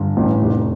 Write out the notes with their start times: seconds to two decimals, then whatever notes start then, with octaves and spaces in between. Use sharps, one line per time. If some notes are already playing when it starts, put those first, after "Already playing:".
Already playing: G1
0.17 A1
0.41 F1